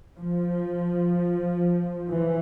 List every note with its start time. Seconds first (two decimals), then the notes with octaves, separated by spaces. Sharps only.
0.19 F3
2.10 E3